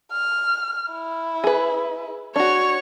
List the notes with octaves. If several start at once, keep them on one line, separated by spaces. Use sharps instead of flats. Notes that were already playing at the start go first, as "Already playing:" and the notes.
F6
E4
G#4 B4
D4 F#4 C#5